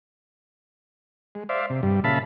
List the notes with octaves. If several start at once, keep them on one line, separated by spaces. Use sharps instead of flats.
G#3
C5 D5 E5 F5
C3
G2 G3
A#2 C#3 E5 F5 A5 B5